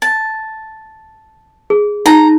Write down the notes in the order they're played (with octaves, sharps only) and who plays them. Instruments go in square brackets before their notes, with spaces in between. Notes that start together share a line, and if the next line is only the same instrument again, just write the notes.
[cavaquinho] A5
[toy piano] G#4
[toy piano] D#4 [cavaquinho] A#5